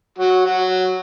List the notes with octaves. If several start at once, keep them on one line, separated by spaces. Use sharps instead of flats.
F#3 F#4
F#3 F#4